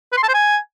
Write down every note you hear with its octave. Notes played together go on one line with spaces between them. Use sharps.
B4
C6
A5
C5
G#5